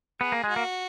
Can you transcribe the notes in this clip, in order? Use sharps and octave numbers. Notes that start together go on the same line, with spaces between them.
B3 G#4
A#3
G#3
F#4
A#3